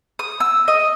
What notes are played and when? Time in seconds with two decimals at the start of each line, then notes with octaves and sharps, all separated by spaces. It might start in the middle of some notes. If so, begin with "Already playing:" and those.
0.19 D#6
0.40 E6
0.68 D#5